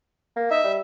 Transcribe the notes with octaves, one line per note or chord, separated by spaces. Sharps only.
A#3
D#4 E5
G3